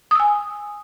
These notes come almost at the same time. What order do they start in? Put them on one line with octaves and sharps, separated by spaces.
D#6 E6 G#5